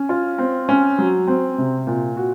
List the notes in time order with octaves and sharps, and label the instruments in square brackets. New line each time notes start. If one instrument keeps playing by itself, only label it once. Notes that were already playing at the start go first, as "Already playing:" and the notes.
Already playing: [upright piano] C#4
F4
C4
C#4
F#3
C4
C3
A#2
F#4